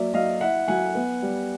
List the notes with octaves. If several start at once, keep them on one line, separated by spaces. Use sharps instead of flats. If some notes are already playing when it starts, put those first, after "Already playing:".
Already playing: F#3 A#3 D5 E5
F#3 D#5 F5
E4 E5 F#5
F#3 F#5 G#5
B3
G3